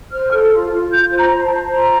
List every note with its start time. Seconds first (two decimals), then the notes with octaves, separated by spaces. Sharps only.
0.12 C5 F6
0.33 A4
0.52 F4
0.72 F4
0.91 F4 G6
1.12 C5
1.18 A#5
1.31 C5
1.44 A5
1.50 C5
1.70 F4 A#5